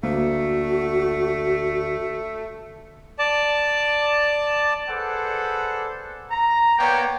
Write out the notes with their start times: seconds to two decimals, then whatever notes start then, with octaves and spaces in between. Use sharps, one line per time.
0.03 D2 A3 A#3 F#4
3.19 D5 A5
4.89 G#4 A4 B4 C5 D5 F#5
6.31 A#5
6.79 A#3 B3 C#5 D5 G5